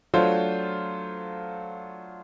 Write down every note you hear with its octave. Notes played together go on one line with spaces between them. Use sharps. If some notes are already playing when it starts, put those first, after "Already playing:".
F#3 A3 D4 F4 C5